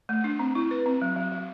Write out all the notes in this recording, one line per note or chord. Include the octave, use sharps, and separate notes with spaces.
A3
D4
C4
E4
B4
C4
F#3
F#3
F#3